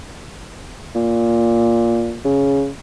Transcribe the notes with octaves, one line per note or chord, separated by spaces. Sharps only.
A#2
C#3